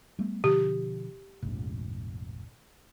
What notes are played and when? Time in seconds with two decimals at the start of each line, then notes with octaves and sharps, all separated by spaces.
0.19 G3 A3 B3
0.44 B2 D3 F3 G4
1.42 F1 A#1 G#2